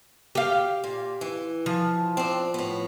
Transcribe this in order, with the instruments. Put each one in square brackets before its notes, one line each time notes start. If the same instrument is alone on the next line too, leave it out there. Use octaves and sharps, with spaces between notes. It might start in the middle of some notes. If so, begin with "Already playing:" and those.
[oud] G4 F5
[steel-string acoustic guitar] A#2
E3
[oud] F3
[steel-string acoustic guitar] C4 D4
A2 B3